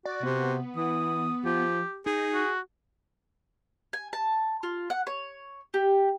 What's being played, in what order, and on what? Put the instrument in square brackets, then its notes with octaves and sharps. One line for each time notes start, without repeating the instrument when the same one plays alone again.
[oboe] F#4 [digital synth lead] D5
[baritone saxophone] C3 [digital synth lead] B3
[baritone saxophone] E3 [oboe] D#6
[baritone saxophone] F3 [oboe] G4
[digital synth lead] D#4 [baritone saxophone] G#4
[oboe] F#4
[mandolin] G#5
A5
F4
F#5
C#5
G4